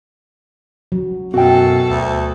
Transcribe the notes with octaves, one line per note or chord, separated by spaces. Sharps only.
F#3
F#2 B2 F#4 A4 G5
D2